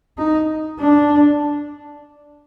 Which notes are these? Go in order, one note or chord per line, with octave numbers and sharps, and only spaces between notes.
D#4
D4